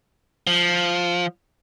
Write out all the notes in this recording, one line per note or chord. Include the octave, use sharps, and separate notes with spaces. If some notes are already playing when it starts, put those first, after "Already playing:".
F3